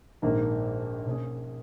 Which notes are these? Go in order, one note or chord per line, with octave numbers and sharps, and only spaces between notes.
A#1 G#2 D#3 A#3
B2 A#3 C#4 G#4